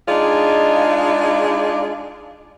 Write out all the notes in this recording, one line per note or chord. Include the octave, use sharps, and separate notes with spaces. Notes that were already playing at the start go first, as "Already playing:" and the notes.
G#3 D4 D#4 F4 G#4 D5